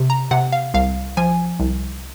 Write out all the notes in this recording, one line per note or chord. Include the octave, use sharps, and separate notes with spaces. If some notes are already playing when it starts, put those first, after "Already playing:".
Already playing: C3
A#5
C3 F#5
F5
C2 F5
F3 G#5
C2